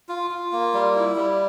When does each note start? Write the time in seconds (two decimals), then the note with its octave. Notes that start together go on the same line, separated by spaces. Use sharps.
0.09 F4
0.31 F4
0.52 A#3
0.74 G3
0.95 E4
1.16 G3